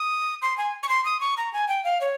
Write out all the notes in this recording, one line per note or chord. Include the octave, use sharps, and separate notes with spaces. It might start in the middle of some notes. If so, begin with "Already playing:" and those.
Already playing: D#6
C6
G#5
C#6
C6
D#6
C#6
A#5
G#5
G5
F5
C#5